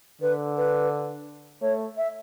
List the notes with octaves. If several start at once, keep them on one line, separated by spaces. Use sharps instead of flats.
D3 B4
B4
A3 C#5
E5